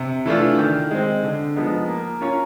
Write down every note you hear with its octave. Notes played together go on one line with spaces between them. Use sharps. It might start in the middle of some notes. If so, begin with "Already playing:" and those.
Already playing: C3
E3 A3 D4 F4
D#3
G#3 C4
D3
F3 G#3 B3 D#4
A#3
C#4 F4 A#4 C#5